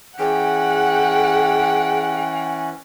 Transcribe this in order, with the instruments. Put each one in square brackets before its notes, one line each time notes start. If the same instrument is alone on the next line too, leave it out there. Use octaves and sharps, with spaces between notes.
[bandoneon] E3 C#4 [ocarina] G#4 [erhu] F#5 [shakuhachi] G5